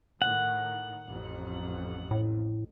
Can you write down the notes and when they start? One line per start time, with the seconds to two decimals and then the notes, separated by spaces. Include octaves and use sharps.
0.22 A2 D#3 F#5
1.08 A1 F2
2.11 A2